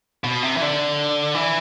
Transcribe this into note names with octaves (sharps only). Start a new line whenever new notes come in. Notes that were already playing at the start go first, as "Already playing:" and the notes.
B2
C3
E3
D3
E3